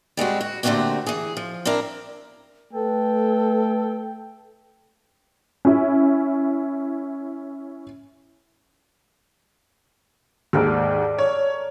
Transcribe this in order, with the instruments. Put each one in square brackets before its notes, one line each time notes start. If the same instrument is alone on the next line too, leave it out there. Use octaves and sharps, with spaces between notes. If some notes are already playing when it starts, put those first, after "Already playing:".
[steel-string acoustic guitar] G3 G#3 C4 F#4
F#4
A#2 D3 A3 C4 F#4 G4
E3 G#4
F3
C4 D4 E4 A#4
[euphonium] A3 [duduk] A4 [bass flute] B4 [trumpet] G5
[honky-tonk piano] C#4 E4
[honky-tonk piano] D#2 G#2 [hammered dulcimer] A4 A#4 D5
[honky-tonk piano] C#5